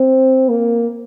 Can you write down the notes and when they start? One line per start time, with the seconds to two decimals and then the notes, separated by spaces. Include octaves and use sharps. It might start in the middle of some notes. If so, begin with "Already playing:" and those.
Already playing: C4
0.49 A#3